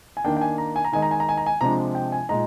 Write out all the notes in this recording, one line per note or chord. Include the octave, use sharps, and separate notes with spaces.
G#5
D#3 A#3 D4 G5
G5
G#5
A#5
G#5
A#5
D#3 G#3 D#4 G#5
A#5
G#5
A#5
G#5
A#5
G#5
C3 F3 G#3 D4 A#5
G5
G#5
A#2 G#3 D#4 A#5